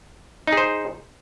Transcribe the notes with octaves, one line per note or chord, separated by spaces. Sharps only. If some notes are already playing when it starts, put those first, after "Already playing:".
D#4 G#4 C5